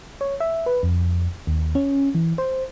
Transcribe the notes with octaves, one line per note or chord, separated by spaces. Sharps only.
C#5
E5
B4
F2
D#2
C#4
E3
C5